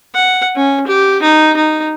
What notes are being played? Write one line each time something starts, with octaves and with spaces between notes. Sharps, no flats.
F#5
C#4
G4
D#4
D#4